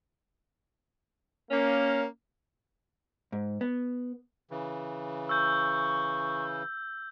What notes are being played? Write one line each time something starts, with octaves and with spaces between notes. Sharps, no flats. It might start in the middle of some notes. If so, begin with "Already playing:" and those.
A#3 C#4
G#2
B3
C#3 E3
C#6 E6 G6